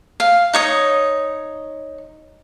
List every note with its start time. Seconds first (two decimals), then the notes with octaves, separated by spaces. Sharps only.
0.20 F5
0.53 D#4 C#5 D#6